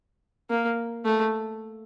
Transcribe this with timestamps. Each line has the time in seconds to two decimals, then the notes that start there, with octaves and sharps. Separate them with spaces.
0.50 A#3
1.05 A3